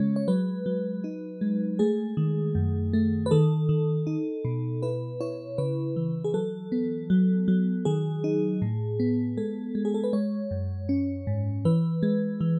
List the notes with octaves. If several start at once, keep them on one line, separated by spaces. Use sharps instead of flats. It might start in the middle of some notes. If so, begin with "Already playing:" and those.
Already playing: C#3 G#3 C#4 C#5
C#5
F#3 B4
F#3
D#4
G#3
A3 G#4
D#3
F#2
A3
B4
D#3 A4
D#3
D#4
B2
E4 B4
E4 C#5
C#3 B4
E3
G#4
F#3 A4
B3
F#3
F#3
D#3 G#4
D#4
A2
B3
G#3 A4
G#3
G#4
A4
B4
G#3 C#5
F#2
C#4
G#2
E3 B4
G#3
E3